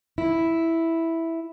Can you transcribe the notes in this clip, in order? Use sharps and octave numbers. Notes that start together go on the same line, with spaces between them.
E4